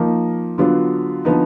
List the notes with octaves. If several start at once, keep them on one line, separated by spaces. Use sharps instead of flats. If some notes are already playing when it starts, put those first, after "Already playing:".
Already playing: F3 A#3 D#4
D3 F#3 B3 F4
D3 F3 B3 D#4